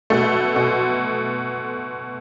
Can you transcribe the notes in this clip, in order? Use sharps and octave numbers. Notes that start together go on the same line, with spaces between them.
B2 A3
B2